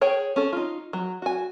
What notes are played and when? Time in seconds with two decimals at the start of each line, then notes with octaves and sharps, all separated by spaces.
0.01 G#4 C#5 G5
0.36 C#4 A4
0.53 D#4 F4
0.93 F#3
1.22 F#4 G#5